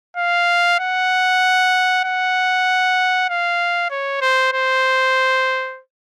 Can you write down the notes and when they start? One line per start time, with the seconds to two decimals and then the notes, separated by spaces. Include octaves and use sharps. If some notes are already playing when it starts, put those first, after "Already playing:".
0.17 F5
0.79 F#5
2.04 F#5
3.29 F5
3.90 C#5
4.21 C5
4.53 C5